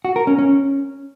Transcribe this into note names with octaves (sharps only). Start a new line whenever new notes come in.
F#4
A#4
C#4
C#4